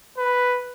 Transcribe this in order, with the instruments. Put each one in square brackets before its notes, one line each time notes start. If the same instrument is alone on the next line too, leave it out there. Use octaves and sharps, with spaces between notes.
[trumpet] B4